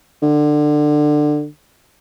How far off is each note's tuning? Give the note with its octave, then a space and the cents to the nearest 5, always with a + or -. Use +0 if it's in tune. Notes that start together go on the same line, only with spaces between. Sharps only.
D3 +20